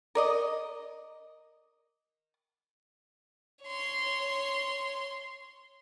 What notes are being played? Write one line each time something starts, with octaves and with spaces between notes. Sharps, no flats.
A#4 D5 D#5
C#5 C6